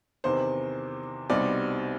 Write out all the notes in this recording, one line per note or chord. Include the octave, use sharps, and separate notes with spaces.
E2 C3 D#3 C5
C2 B2 G3 C4 D#4 D5